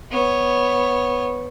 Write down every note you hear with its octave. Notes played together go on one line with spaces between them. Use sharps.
B3 C#5